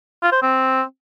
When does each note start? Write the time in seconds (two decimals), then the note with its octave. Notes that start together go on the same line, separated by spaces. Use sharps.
0.22 F4
0.32 C5
0.42 C4